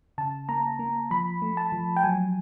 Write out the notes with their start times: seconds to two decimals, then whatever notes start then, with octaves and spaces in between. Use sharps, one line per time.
0.18 C#3 A5
0.49 A#3 A#5
0.79 A#3
1.11 F3 B5
1.42 A3
1.57 A5
1.72 F3
1.96 G5
2.03 F#3 G#5